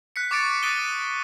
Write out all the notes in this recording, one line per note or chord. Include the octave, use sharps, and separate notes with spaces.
F#6 B6 C#7
C#6 D6 F#6 A6 C#7 D7
D#6 F#6 A6 D7 D#7 G7